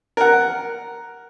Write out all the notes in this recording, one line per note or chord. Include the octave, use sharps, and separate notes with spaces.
A#4 F#5